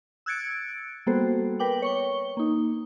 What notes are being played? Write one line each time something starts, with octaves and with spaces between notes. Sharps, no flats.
E6 F#6 G#6 A6 C#7 D7
G3 A#3 B3 F#4 A4 C5
A#4 B4 G5 D6 F#7
C#5 C#6 G7
A#3 D#4